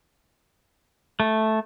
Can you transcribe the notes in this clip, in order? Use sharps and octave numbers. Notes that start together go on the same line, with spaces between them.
A3